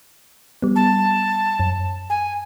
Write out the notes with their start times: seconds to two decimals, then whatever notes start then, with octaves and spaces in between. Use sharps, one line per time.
0.62 G3 B3
0.76 A5
1.60 F#2
2.10 G#5